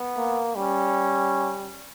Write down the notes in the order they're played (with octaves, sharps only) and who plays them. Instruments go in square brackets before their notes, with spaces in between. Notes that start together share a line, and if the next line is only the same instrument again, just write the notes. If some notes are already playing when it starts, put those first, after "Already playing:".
Already playing: [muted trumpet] B3
[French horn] A#3
[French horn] G3 [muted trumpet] C#4